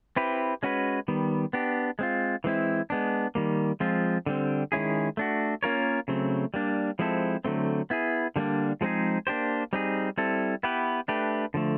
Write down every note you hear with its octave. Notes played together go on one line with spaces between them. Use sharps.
C4 E4 G4 B4
G#3 C#4 F#4 B4
D#3 G3 B3
B3 D4 G4
G#3 C4 F4
E3 G#3 C4 E4
G#3 B3 D4
D#3 G3 A#3
F3 G#3 C4 F4
D3 G3 C4
D#3 G#3 C#4 E4 G#4
A3 D4 F#4
A#3 C#4 F4 A#4 C#5
C#3 F#3 A3 C4
G3 A#3 D4
F3 G#3 C4 E4 A4
D3 F#3 A3 C4
B3 E4 G#4
D3 G3 A#3 D4
F3 G#3 C4 D#4 G#4
A#3 D4 G4 C5
G3 C4 D#4 G#4
G3 C4 E4 A4
B3 E4 G4 B4
A3 D4 G4 B4
D3 F3 A3